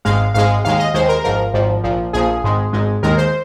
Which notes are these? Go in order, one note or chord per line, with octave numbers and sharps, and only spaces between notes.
G#1 G#2 G#3 F5
G#1 G#2 G#3 F5
D#2 D#3 G#3 F5
D#5
D#2 D#3 G#3 C5
A#4
G#1 G#2 F3 A#4
G#1 G#2 F3
A#1 A#2 F3
A#1 A#2 F3 G#4
G#1 G#2 G#3
G#1 G#2 G#3
D#2 D#3 G#3 A#4
C5